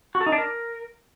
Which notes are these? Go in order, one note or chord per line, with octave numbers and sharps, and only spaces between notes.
F#4
A4
D#4
D4
A#4